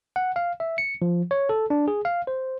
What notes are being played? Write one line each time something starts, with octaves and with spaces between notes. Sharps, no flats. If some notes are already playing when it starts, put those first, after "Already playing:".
F#5
F5
E5
C#7
F3
C#5
A4
D4
G#4
F5
C5